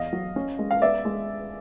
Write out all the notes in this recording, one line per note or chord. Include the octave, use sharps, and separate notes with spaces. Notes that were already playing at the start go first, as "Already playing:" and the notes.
Already playing: E2 D#5 F5
F#3
C#4
G#3
F5
B3 D5 E5
G#3